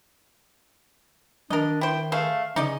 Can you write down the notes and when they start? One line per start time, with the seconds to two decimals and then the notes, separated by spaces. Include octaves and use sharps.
1.50 D#3 D4 A#4 D#5
1.81 E4 C5 G5
2.12 A3 G#4 C5 F5
2.56 C#3 C#4 D#4 D5 D#5